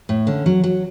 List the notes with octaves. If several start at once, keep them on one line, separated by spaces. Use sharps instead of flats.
A2
D3 C#4
F#3
F#3